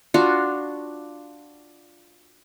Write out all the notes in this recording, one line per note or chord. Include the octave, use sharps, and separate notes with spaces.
D4 F4 F#4 F5